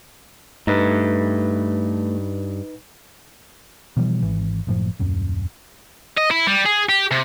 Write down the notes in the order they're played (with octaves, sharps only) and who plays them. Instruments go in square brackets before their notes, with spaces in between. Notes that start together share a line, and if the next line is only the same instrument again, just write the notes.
[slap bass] G2 [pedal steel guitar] A3 [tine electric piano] D#4 B4
[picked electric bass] B2 E3 F3 G3
G#1 E3
F#1 A2 F3
D#1 F#2
[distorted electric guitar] D#5
E4
G3
G#4
G4
C3